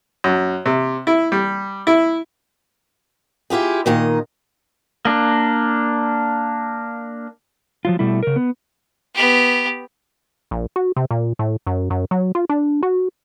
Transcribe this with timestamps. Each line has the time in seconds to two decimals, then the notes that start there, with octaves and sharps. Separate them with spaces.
0.24 F#2
0.66 C3
1.07 E4
1.32 G3
1.87 E4
3.50 E4 F4 G4 G#4
3.86 A#2 D#3 D#5
5.05 A#3 D4
7.85 F3 F#3 F4
7.99 B2 G3 A3 E4
8.23 C#3 A#4
8.36 B3
9.15 B3 G4
10.51 A#1
10.76 F#4
10.96 C3
11.11 A#2
11.39 A2
11.67 F#2
11.90 F#2
12.11 F#3
12.35 F4
12.49 D4
12.83 F#4